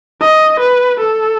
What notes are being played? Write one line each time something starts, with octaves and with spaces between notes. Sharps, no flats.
D#5
B4
A4